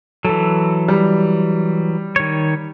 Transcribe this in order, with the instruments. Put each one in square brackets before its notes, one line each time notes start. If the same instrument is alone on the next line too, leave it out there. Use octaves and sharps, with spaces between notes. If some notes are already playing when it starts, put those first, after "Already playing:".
[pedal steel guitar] E3 F#3 [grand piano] A4
[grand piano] G3
[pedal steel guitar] D#3 C#5